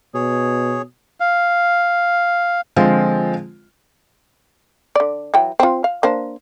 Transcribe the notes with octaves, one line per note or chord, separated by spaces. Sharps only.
B2 G#4 C#5
F5
D3 F3 G#3 C4 F4
D3 D5
E3 F#3 G5
C4 F4
F5
A#3 D4 C5